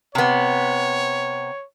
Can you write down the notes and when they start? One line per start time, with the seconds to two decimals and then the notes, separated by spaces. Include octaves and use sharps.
0.15 C3 B3 C#5